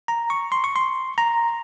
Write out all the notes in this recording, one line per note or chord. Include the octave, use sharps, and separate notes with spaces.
A#5
C#6
C6
C#6
C6
A#5